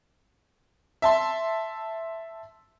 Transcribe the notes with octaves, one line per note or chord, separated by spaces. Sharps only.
E5 A5 C6